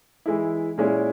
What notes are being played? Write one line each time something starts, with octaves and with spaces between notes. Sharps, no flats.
E3 G#3 E4
A#2 G#3 C#4 E4